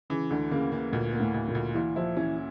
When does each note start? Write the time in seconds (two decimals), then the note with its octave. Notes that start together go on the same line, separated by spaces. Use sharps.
0.10 C#3 E3
0.30 D2 D3
0.51 C#3 A#3
0.72 C#3 A#3
0.92 D2 A#2
1.13 A#3
1.20 A2
1.34 D2
1.48 A#2
1.55 D2
1.75 A#2 E3
1.96 F3 E4
2.17 E3 C#4